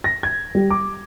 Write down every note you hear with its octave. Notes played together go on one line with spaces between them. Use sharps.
A#6
G#6
G3
D6